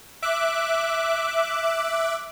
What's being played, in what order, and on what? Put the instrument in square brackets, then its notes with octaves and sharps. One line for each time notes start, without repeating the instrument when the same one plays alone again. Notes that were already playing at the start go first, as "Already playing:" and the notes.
[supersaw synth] E5 D6 F#6